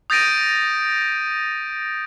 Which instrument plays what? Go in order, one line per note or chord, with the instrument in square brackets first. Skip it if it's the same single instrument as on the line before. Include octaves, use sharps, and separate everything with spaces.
[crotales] D#6 G6 A6 A#6 D7 D#7